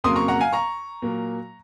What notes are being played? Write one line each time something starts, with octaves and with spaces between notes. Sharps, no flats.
F2 C#3 F#3 A#3 C6 D#6
A#5 C#6
F#5 A#5
F5 G#5
A#5 C#6
A#2 F#3 A#3